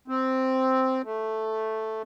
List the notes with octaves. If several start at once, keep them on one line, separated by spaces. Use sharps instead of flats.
C4
A3